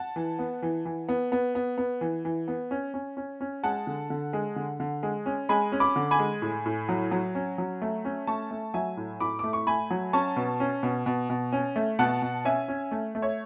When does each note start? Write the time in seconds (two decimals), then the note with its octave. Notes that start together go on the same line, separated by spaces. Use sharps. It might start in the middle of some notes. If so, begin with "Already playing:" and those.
Already playing: F#5 A5
0.16 E3
0.39 B3
0.62 E3
0.85 E3
1.09 B3
1.32 B3
1.55 B3
1.78 B3
2.01 E3
2.25 E3
2.48 B3
2.71 C#4
2.94 C#4
3.17 C#4
3.41 C#4
3.63 G#3 F#5 A5
3.87 D3
4.10 D3
4.33 G#3
4.56 D3
4.80 D3
5.03 G#3
5.26 C#4
5.49 G#3 G#5 B5
5.72 C#4
5.80 B5 D6
5.96 D3
6.11 G#5 B5
6.19 G#3
6.42 A2
6.66 A2
6.89 F#3
7.11 F#3
7.35 C#4
7.58 F#3
7.82 A3
8.05 C#4
8.27 A3 A5 C#6
8.51 A3
8.74 F#3 E5 G#5
8.97 A2
9.20 A2 B5 D6
9.39 A3 D6
9.53 C#6
9.67 A3 G#5 B5
9.90 F#3
10.13 C#4 A5 C#6
10.36 B2
10.60 C#4
10.83 B2
11.06 B2
11.30 B2
11.53 C#4
11.76 A3
11.99 B2 F#5 A5
12.22 B2
12.45 C#4 E5 G#5
12.68 C#4
12.91 A3
13.15 A3
13.22 C#5 E5